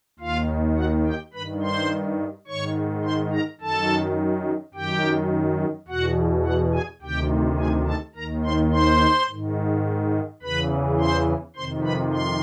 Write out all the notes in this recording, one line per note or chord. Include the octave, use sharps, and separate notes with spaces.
D#2 D#3 F4 F5
F#4 F#5
G4 G5
G2 D#3 B4 B5
C5 C6
G#2 D#3 C#5 C#6
C5 C6
A#4 A#5
F#2 D#3 A4 A5
F#2 D#3 G4 G5
E2 B2 F#4 F#5
F#4 F#5
G#4 G#5
D2 C3 D#3 G4 G5
G#4 G#5
A4 A5
D#2 D#3 A#4 A#5
C5 C6
C5 C6
G#2 D#3
E2 C#3 E3 B4 B5
C5 C6
F2 C3 D#3 C5 C6
B4 B5
C6